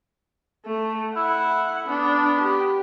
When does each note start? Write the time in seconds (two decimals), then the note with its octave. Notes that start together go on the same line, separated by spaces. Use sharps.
0.66 A3
1.16 E4 F#5
1.88 B3 D4
2.40 G4